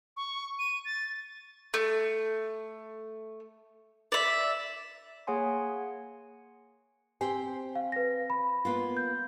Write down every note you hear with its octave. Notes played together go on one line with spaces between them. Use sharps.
C#6
D#7
A6
A3
D5 E5
A#3 G#4 C#5 F#5 G#5 C6
C4 G4 C5 G#5
F5
B4 A#6
B5
A#3 B3 F4
G6